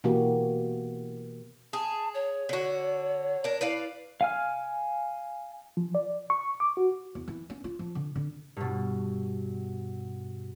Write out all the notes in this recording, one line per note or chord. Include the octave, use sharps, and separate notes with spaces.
B2 E3 A#3 B3 F#4 G4
G#4 A5
C#5
D3 F#4
D4 A#4
E4 B4 D5 F5
F5 G#5 F6
F3
D5
C#6
D6
F#4
E2
E3
C#4
F4
F3
D3
D3
G2 B2